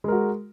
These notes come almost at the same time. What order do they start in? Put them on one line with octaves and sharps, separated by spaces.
G#3 A#4 F#4